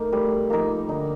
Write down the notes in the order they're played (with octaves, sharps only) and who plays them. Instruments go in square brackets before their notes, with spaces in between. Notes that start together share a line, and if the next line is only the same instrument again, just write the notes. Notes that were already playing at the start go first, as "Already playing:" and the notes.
Already playing: [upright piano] A3 [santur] A#3 D#4 A#4
[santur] G3 [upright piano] A3
[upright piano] F3 [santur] A#3 D#4 A#4
[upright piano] D3 [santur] D#4